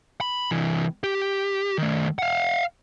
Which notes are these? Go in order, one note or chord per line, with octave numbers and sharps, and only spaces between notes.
B5
C3 E3
G4
D#3 A3
F5 F#5